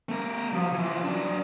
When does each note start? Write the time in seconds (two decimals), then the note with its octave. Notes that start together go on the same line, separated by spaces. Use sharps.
0.09 A3 A#4
0.52 F3 F#3
0.73 E3 F3
1.04 F#3 D4